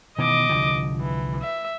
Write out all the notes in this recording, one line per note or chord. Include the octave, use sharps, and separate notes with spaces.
B2 D#3 E3 D#5 D6
C2 D3 F3
E3
E5